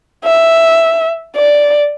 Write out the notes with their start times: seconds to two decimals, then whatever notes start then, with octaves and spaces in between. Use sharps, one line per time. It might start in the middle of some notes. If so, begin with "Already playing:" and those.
0.25 E5
1.36 D5